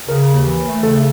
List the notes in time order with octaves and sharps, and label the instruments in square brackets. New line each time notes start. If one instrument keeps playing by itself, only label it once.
[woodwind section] C#3 [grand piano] A#4
[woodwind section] D#2
E3
A3
[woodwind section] C#3 [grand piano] A4